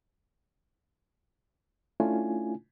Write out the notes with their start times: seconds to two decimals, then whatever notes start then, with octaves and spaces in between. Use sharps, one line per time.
2.00 A3 C#4 D4 E4 F4 G#5